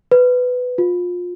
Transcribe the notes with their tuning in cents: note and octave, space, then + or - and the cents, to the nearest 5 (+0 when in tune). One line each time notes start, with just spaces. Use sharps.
B4 +10
F4 +25